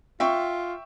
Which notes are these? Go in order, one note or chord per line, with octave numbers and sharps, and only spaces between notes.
F4 E5 G5 C#6